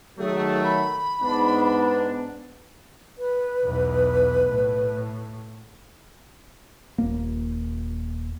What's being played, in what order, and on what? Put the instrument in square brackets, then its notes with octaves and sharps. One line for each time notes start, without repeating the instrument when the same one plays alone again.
[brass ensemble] D#3 F#3 A3 [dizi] G#4
[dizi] B5
[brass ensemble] G#2 B3 D4
[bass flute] B4
[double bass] B1 E2
A2
[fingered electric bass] D#1 A#3